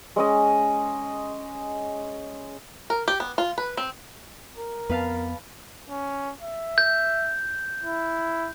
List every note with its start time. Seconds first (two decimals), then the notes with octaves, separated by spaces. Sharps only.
0.16 G#3 C#4 D#5
2.90 A#4
3.08 G4
3.20 B3
3.38 F4
3.58 B4
3.77 C4
4.58 A#4
4.89 F2 B3 B4 F5 A5
5.90 C#4
6.42 E5
6.78 G6
7.84 E4